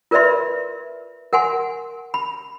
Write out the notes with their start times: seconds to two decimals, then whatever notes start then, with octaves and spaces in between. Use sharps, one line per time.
0.11 F4 A#4 B4 D5 E5 C6
1.33 A#4 F#5 G#5 C6
2.14 B5